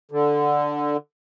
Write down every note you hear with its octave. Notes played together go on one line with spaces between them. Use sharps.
D3